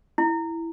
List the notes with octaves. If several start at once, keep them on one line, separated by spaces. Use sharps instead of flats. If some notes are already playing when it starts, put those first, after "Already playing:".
E4